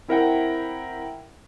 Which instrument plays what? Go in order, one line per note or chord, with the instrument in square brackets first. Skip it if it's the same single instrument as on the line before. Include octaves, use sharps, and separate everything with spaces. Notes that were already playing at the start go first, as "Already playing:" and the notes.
[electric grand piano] C4 E4 A#4 E5 F#5 G5